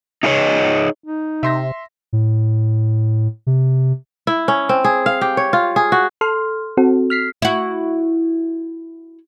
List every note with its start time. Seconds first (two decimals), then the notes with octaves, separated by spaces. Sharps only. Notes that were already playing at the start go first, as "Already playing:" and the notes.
0.23 D#4 E4 G#4 A#4 C#5 D#5
1.05 D#4
1.43 C3 E5 C6 A#6
2.13 A2
3.47 C3
4.27 E4
4.48 C#4
4.69 C4
4.84 G#4
5.06 F5
5.21 G4
5.37 C#5
5.53 F4
5.76 G#4
5.92 F#4
6.21 A4 C6 F6
6.77 C4 F#4 A4
7.10 F6 B6 C7
7.42 E4 F#4